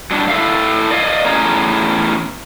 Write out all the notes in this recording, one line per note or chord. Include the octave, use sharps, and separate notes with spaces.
F#3 G3 D4
E4 A4 E5 F5
D5 D#5 F5
E2 A2 C#4 G#4 A#5